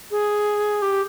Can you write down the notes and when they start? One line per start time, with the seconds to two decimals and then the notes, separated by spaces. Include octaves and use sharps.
0.11 G#4
0.82 G4